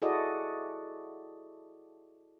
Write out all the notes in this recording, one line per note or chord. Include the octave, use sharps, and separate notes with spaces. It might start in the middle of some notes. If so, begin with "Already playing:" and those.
E4 F#4 G#4 A4 D5 D#5